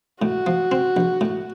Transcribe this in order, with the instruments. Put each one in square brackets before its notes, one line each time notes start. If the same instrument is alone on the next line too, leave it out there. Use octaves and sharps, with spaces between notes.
[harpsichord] A2 [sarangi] F#4
[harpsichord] F3
C4
A#1
A2